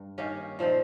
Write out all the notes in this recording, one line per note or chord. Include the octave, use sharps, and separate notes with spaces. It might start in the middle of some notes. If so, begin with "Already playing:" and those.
Already playing: G2
D#3 A#3 C#4 G4
A#2 F3 C4 D#4